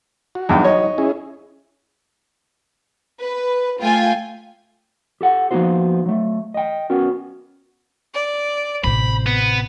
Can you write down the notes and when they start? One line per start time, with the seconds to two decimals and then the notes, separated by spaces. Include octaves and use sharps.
0.35 F#4
0.49 E2 G2 F#3 D#4 G5
0.64 C#5 D#5
0.98 C#4 E4 G#4
3.20 B4
3.81 A3 F4 G5 G#5
5.21 G4 A4 F#5
5.51 F3 A#3 B3 D#4 F#4 C5
6.06 F#3 A3
6.54 D#5 G5
6.90 B3 C#4 F#4 A#4
8.14 D5
8.84 A1 C3 C5 B5
9.26 B3